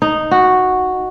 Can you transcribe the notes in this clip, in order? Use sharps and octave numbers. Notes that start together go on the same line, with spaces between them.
D#4
F#4